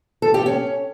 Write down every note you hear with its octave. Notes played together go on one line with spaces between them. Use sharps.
A4
G4
C#4